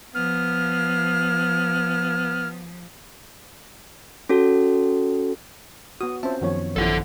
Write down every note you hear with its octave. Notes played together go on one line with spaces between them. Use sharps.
F3 B3 F6
C#4 F#4 A4
B3 F#4 D#6
C4 C#4 F4 C5 E5 A5
F#2 D#3 F3 B3 C#5
A1 D#3 F3 E4 A4 F#5